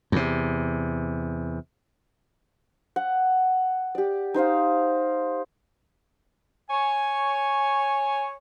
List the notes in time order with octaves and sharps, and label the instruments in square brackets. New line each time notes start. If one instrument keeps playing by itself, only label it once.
[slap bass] E2 C3
[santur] F#5
G4 D5
D#4 C5 D#5 F5
[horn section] C#5 G#5